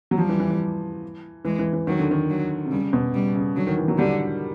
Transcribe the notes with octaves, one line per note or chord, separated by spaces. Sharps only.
F#3
F3 G3
E3
E3
E3
E3 G#3
E3
E3
D#3 F#3
D3
D#3
F#3
C3
C#3 G3
B2
C#3 G3
C#3
D3 F#3
D#3
E3
F#3
D3 G3